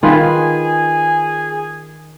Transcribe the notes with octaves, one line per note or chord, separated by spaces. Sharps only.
D#3 F4 G#4 B4 G#5